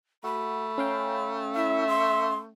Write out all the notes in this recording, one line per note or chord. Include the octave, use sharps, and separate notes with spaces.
A3 F#4 B5
C#4 F5 G5
E4 E5
C6